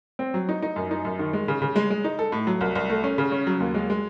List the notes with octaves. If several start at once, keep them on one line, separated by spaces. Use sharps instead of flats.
C4
F#3
D#4
D#4
F#2
D#4
F#2
D#3
G#3
C#3
C#3
G#3
G#3
D#4
A4
A2
F#3
C2
C2
A3
C#4
C#3
C#4
F#3
D#2
G#3
G#3